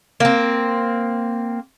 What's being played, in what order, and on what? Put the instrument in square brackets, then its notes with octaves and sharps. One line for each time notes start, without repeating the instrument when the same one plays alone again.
[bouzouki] A#3 C4